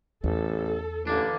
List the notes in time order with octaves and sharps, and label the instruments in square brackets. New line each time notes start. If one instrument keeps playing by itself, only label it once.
[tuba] A1 [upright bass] E2 [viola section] A4
[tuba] A1 [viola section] D3 E3 [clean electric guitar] A#3 D4